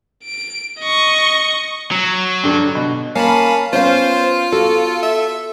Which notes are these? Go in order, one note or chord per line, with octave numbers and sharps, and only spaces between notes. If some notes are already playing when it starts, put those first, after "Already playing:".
D7
D#5 C#6
F#3
G2 D3
B2
A#3 C#4 F5 A5 B5
B3 C#4 F4 C5 F5
F#4 A4
E5